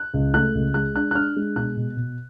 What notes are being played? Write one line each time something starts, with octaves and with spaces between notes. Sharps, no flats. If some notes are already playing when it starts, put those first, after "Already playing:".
Already playing: F#6
C#2
A3 F#6
C#2
G#3 F#6
D4 F#6
F#6
D4 F6
G#3
B2 F#6
B2
B2